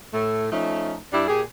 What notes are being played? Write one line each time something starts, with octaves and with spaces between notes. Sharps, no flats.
A2 A3
F3 A3 C#4 D#4
G2 G3 D4 E4
A#2 G4 G#4